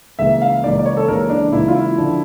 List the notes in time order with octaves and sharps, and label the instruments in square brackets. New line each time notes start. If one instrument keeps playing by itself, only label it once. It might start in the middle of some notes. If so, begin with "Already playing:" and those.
[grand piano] C#2 C#3 E3 A#3 E5
F5
C#2 C#3 E3 A#3 D5
D5
C#5
A4
C#2 C#3 E3 A#3 A#4
D4
C#2 C#3 E3 A#3 E4
F4
E4
D3 F3